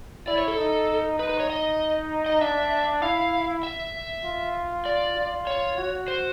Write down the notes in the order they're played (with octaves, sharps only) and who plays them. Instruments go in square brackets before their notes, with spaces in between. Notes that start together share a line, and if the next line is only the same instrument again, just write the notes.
[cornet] E4 [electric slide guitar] D5
[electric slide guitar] C#5
A4
[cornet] D#4
[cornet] D#4 [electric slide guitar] B4
[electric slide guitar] B4
C#5
D#5
D#5
[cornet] D4 [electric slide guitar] E5
[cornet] E4 [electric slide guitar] F5
[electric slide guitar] E5
[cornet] F4
[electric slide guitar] D5
[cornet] F4
[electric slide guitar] C#5
[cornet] F#4
[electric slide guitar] C5